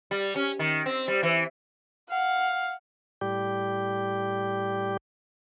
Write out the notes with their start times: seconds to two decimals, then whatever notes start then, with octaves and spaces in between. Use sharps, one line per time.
0.11 G3
0.35 C#4
0.59 D#3
0.86 C4
1.08 G3
1.23 E3
2.10 F5 F#5
3.21 A2 G3 G4